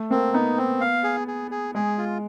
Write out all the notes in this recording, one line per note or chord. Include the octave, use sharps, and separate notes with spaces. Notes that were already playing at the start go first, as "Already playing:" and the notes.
Already playing: A3
A#3 C4
B3 D#4
C4
F5
G#4
G#4
G#4
G#3 G#4
F4